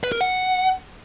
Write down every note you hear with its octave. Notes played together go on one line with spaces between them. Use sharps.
B4
A#4
F#5